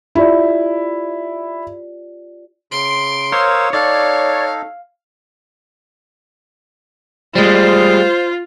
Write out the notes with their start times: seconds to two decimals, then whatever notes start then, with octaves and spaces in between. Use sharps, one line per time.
0.15 E4 F4 G4 D5
2.72 C#3 C6 D7
3.32 A#4 C5 C#5 F5 D#6 E6
3.73 D#4 A4 D5 F5
7.35 G3 G#3 F4 C5